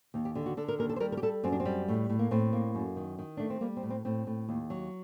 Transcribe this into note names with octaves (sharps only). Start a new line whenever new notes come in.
D#2 D#4
G4
D3 G4
F#4
D3 A4
A#4
D#2 A#4
A4
C5
G3 A#4
A#4
G4
G3 A4
F#2 C4
D4
C4
G3
A2
A2
A#3
A2 C4
A#3
F#2
D#3
D#3
A3 D4
C4
G3 A#3
C4
A2
C4
A2 C4
A2
D#2
F#3